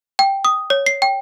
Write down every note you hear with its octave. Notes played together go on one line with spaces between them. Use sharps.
G5
D#6
C#5
C7
G5